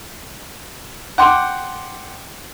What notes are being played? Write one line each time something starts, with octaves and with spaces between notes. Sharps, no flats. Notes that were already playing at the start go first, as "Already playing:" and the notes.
F#5 G5 C6 D6